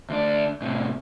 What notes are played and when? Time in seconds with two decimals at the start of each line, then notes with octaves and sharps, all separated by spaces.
0.10 D2 D4
0.62 A2 C3